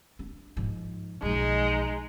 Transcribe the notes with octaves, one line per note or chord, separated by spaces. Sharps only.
D4
G#2 F3
B1 F3 G#3 D#4